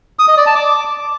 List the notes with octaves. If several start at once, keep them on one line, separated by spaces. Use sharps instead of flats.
D#6
D#5
D5
A5
D6